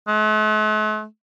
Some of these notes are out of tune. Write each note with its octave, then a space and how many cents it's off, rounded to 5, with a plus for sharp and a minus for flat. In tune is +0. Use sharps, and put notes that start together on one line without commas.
A3 -45